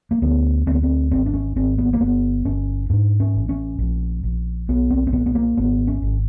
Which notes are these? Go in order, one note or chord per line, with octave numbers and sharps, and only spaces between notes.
A#3
D2 B3
D2 C4
B3
C4
G#1 C4
D4
C#4
G#1 C4
B3
A#3
G1 B3
G1 C#4
G#2 D4
C#4
A1
C#4
A#1
A#1
B1 B3
C4
C4
A#2 B3
B3
A#3
G#1 B3
C#4
G#1